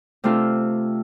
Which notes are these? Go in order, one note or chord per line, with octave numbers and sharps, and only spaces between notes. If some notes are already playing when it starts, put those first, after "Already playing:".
C3 A3 D4 F4 A4